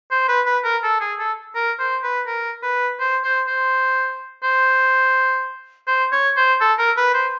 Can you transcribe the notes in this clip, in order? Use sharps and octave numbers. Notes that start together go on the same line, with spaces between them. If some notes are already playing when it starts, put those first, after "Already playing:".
C5
B4
B4
A#4
A4
G#4
A4
A#4
C5
B4
A#4
B4
C5
C5
C5
C5
C5
C#5
C5
A4
A#4
B4
C5